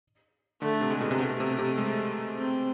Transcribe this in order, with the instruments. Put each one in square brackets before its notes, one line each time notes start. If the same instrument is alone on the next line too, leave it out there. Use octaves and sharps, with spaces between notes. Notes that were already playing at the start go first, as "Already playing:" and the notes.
[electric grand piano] D3 [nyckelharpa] A3
[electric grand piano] C3
[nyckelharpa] G#3
[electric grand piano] B2
C3
[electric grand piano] B2 [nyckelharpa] A3
[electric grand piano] C3
C3
G#3
[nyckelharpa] C4